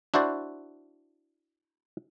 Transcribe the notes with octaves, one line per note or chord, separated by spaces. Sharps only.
D4 E4 F#4 C5 D5